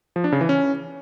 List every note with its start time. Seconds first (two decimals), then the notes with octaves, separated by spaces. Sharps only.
0.16 F3
0.24 D4
0.32 C#3
0.41 E3
0.49 C#4